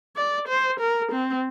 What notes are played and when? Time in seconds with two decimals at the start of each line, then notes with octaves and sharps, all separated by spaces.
0.16 D5
0.48 C5
0.80 A#4
1.12 C4